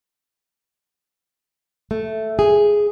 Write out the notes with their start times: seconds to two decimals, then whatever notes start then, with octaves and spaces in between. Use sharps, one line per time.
1.91 A3
2.39 G#4